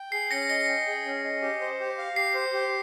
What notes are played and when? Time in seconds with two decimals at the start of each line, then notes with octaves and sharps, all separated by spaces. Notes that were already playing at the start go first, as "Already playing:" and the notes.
Already playing: G5
0.12 G#4 C7
0.31 C#4 A#6 C#7
0.49 D#5 A#6 C#7
0.68 G5
0.87 G#4
1.05 C#4
1.24 D#5
1.42 G4
1.61 C5
1.80 G4
1.98 F5
2.16 G4 C7
2.35 C5
2.54 G4